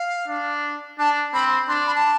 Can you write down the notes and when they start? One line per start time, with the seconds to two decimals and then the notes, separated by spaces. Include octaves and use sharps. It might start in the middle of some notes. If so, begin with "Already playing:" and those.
Already playing: F5
0.28 D4
0.99 D4 A5
1.34 C4 B5
1.68 D4 C6
1.87 B5
1.95 A5